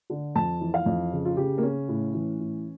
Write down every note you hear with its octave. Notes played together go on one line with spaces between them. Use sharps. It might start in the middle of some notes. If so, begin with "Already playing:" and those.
D3
F2 A5
E3
F5
F2
C#3
F4
C#3 G4
A#3
C#3 C#4
A2
E3
A2